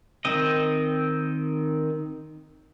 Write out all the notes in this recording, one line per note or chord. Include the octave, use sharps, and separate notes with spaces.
D#3 C4 D#5